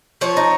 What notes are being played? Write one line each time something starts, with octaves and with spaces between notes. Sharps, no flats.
F3 C#5
D#4